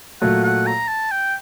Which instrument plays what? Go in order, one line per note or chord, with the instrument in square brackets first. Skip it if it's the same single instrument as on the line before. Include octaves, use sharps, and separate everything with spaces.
[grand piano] A#2 F#3 A3 [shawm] F#5
[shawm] F#5
A#5
A5
G5